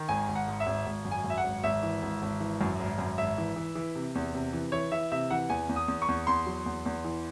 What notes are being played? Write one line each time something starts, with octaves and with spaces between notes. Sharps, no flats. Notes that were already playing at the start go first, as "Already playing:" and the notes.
Already playing: D#3
G#1 G#5
G#1
F#5
G#2
E5
G#1
G#1
F#2
G#5
F#2
E5
F#5
G#1
G#1 E5
E3
G#1
G#1
E3
F#2
G#1
F#2
G#1 E5
E3
E3
E3
C3
E2
C3
E3
E3 C#5
E3 E5
C3 E5
E3 F#5
E2 G#5
E2
D#6
E2
C#6
E2
E2 C6
F#3
E2
E2
E3